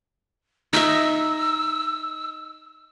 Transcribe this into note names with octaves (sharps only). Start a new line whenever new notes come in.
D#4 E5 E6